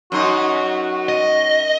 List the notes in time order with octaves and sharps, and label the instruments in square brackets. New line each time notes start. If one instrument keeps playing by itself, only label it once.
[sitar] F#2 D#4 [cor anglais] F#4
[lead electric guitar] D#5